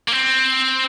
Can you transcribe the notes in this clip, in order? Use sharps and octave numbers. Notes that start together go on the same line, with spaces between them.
A#3
C4